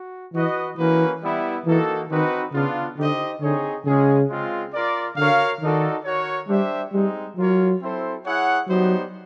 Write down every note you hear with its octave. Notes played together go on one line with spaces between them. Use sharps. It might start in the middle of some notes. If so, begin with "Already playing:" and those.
Already playing: F#4
E3 F#4 B4 D#5
E3 A#3 C#4 F#4 B4
G3 B3 E4
E3 A#3 D#4 F#4 A4
D#3 C4 D#4 F#4 B4
C#3 B3 D4 F4
D3 D#4 G4 C5 D#5
D3 C4 D#4 G#4 C#5
C#3 G#3 C#4 F4 G#4
G#3 C4 F4
F4 A#4 D5
D3 F#4 A#4 C#5 F5
D#3 D#4 F#4 A4 D5
F#4 A#4 C#5
G3 D4 G4 C5 E5
G3 G#3 C4 D#4
F#3 F4 A#4 C#5
C4 E4 A4 C5
E4 G#4 C#5 F#5
F#3 G3 B3 D#4 G4 C5